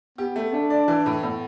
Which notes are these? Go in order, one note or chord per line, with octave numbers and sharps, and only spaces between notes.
B3 G4
A3
A3 D4
D5
E3
A2
A2 B3